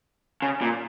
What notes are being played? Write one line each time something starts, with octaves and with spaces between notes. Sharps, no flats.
C#3
A#2